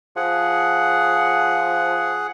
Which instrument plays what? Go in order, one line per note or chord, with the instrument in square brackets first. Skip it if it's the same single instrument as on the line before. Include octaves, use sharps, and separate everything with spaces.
[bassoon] F3 [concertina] G#4 F#5